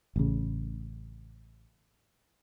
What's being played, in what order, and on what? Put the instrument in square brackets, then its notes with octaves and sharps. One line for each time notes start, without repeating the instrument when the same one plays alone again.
[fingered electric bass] A1 C#3